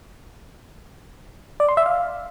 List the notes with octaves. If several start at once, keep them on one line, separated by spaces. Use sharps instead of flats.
D5
C6
E5
F5